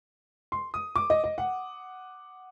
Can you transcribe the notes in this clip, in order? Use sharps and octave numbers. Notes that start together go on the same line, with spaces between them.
C6
D#6
D6
D#5
D#5
F#5